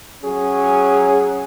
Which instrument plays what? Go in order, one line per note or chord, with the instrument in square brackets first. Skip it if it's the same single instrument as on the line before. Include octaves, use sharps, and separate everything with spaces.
[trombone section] F#3 C#4 G#4